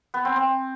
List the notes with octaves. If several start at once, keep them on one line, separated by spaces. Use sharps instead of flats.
B3
C4
C4